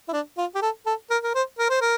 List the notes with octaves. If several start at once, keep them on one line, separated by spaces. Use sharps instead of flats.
E4
D4
F4
G4
A4
A4
A#4
A#4
C5
A#4
C5
A#4